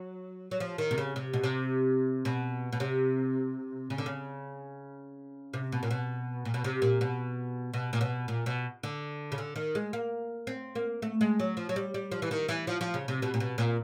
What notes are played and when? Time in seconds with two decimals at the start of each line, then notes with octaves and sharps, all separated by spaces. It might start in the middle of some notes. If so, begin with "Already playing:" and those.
Already playing: F#3
0.51 F#3
0.60 F3
0.78 D#3
0.91 C3
0.98 C#3
1.16 C3
1.33 B2
1.43 C3
2.25 B2
2.72 B2
2.80 C3
3.90 C#3
3.98 D3
4.06 C#3
5.54 C3
5.72 B2
5.83 A#2
5.91 B2
6.45 A#2
6.54 B2
6.64 C3
6.82 A#2
7.01 B2
7.74 B2
7.93 A#2
8.01 B2
8.28 A#2
8.46 B2
8.83 D3
9.32 C#3
9.38 D3
9.56 D#3
9.75 G#3
9.93 A#3
10.47 C4
10.75 A#3
11.02 A3
11.21 G#3
11.40 F#3
11.57 F3
11.69 F#3
11.76 G3
11.94 G3
12.11 F3
12.22 E3
12.31 D#3
12.49 E3
12.67 F3
12.81 F3
12.94 C#3
13.08 C3
13.22 B2
13.34 A#2
13.40 B2
13.58 A#2